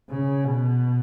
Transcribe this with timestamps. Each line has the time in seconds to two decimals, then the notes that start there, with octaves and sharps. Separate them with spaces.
0.10 C#3
0.45 B2